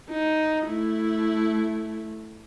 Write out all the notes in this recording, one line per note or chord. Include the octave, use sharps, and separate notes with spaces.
D#4
A3 E4